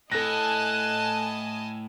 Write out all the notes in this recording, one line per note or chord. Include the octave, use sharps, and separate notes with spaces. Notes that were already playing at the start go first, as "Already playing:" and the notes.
A2 E4 A4 D#5 G#5 A5 F#6 A#6